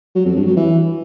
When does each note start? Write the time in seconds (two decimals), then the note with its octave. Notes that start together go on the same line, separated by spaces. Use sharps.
0.15 F#3
0.25 F2
0.36 G2
0.46 F#3
0.56 E3